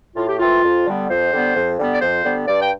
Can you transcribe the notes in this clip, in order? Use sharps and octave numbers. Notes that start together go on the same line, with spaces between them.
A2 F4
G4
E3 A3 C4 F4
F2
D3 G3 B3
F2 C5
D3 G3 B3
F2
D3 G3 B3
D5
F2 C5
D3 G3 B3
G2 D5
G5